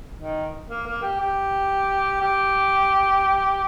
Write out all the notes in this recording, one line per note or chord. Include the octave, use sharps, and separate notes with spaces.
D#3
A#3
A#3
G4
G4
G4